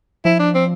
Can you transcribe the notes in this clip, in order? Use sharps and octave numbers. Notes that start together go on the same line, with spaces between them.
F3 E4
D4
C4